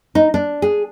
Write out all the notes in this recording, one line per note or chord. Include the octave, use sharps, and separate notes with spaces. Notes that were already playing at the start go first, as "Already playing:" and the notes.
D#4
D4
G#4